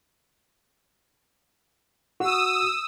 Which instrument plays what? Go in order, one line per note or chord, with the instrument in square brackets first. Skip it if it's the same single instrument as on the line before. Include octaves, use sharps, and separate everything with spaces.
[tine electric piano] F#4 [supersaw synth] D#6 E6